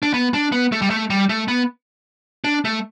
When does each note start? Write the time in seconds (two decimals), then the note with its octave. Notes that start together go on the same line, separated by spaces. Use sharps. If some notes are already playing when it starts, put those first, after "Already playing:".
0.03 D4
0.14 B3
0.34 D4
0.52 B3
0.72 A3
0.82 G3
0.90 A3
1.10 G3
1.29 A3
1.48 B3
2.44 D4
2.65 A3